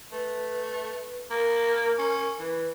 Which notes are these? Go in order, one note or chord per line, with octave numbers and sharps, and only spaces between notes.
A3 B4
A#3 A#4
C#4
E3 B4